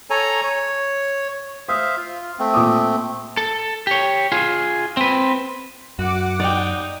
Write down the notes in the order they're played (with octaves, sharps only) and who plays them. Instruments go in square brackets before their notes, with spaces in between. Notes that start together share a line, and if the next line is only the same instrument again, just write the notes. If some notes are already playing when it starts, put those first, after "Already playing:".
[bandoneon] A4 C#5 G#5 A#5
C#5
[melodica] C5 E5 F5 [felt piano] D#6
[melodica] F4
A3 C4
[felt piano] A#2 D6 D#6
[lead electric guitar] A4
G4 C#5
F4 G#4
C4 B4
[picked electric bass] F#2 [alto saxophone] F#4 [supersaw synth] F#5 D6
[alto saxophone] D#4 [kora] D5 G5